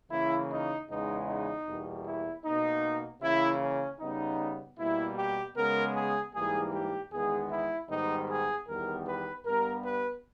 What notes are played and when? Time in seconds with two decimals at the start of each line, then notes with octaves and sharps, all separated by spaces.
0.11 C#3 E3 A#3 E4
0.51 D#4
0.90 E2 C#3 G#3 B3 D#4
1.27 D#4
1.68 E2 B2 G3 A#3
2.07 E4
2.45 B2 A#3 D#4
3.22 C#3 E3 A#3 E4
3.62 C#4
4.00 C#3 G3 B3 D#4
4.79 B2 G3 A#3 E4
5.18 G4
5.57 C#3 G#3 B3 A#4
5.95 G#4
6.34 G#2 E3 G3 A#3 G#4
6.74 G4
7.12 E2 D#3 G#3 B3 G#4
7.51 E4
7.90 G#2 D#3 G3 B3 D#4
8.30 G#4
8.68 E2 D#3 G3 B3 A#4
9.07 B4
9.45 G2 G3 B3 A#4
9.85 B4